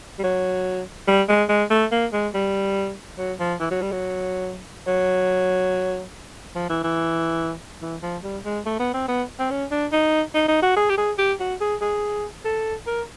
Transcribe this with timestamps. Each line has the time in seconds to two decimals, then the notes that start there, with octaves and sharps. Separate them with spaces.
0.19 G3
0.24 F#3
1.08 G3
1.29 G#3
1.49 G#3
1.70 A3
1.92 A#3
2.13 G#3
2.34 G3
3.18 F#3
3.40 F3
3.60 E3
3.71 F#3
3.82 G3
3.92 F#3
4.87 F#3
6.55 F3
6.69 E3
6.84 E3
7.82 E3
8.03 F3
8.23 G3
8.45 G#3
8.66 A3
8.80 B3
8.94 C4
9.08 B3
9.39 C4
9.50 C#4
9.71 D4
9.92 D#4
10.34 D#4
10.48 D#4
10.62 F#4
10.76 G#4
10.90 G4
10.97 G#4
11.18 G4
11.40 F#4
11.61 G#4
11.82 G#4
12.45 A4
12.87 A#4